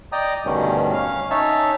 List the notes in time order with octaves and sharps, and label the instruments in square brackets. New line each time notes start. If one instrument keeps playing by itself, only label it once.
[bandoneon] D5 D#5 G5 A#5 D#6
D2 G2 B2 D#3 G3 C#4
C#4 F5
C#4 D#4 C#5 E5 A5